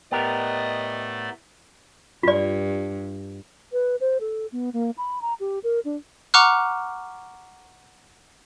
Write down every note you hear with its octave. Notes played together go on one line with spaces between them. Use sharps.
A2 A3 B3 G4 A#4 D5 D#5
G2 F4 D5
B4
C5
A4
B3
A#3
B5
A#5
G4
A#4
D4
F#5 A#5 C#6 D6 F6 F#6